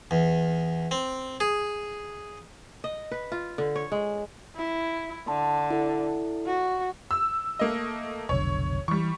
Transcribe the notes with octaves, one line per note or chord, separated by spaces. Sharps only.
E2
C4
G#4
D#5
B4
F4
D3
C#5
G#3
E4
D3 A5 C6
E4 A4
F#4
E6
A3 A#3 D#5
F1 B1 D3 C#5
E3 G3 C#6